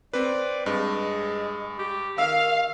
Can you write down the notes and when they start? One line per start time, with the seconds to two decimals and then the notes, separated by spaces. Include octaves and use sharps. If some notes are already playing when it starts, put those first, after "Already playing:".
0.13 C4 B4 D5
0.66 G2 G#3
1.79 G4
2.18 D#3 F5 E6 F6